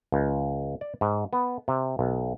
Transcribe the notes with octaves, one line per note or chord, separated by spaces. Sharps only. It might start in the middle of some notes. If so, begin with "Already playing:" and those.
C#2
D5
G#2
B3
C3
B1